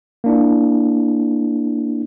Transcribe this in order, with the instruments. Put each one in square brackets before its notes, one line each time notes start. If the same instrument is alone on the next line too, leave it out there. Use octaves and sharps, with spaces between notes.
[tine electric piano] A#3 D4 E4